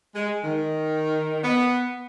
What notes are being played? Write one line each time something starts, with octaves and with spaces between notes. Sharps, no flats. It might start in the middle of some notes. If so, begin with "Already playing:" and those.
G#3
D#3
B3